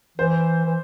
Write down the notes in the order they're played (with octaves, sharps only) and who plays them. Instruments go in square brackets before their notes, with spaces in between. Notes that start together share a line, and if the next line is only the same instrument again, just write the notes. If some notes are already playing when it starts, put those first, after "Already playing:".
[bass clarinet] E3 [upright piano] C5
[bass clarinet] E3